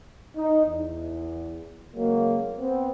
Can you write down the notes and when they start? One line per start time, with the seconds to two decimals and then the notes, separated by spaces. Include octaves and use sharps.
0.37 D#4
0.67 E2
1.95 C#3 F#3 G#3 A#3
2.57 B3 C4